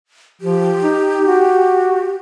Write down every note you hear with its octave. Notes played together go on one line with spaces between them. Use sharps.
F3 G4
D#4
F#4